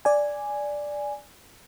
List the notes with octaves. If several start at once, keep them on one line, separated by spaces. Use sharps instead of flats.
D5 G#5